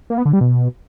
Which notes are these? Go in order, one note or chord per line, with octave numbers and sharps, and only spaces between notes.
A#3
B3
D3
G3
B2